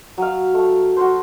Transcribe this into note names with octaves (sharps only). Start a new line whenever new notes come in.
F#3 F5
A3
F#4 C5